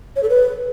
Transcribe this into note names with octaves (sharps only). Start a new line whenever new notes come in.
C#5
A4
B4